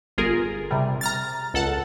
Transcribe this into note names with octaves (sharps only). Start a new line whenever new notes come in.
G1 F4 G#4 A#4
C3 G3
A#5 F6 A6
C#2 A4 F#5 A5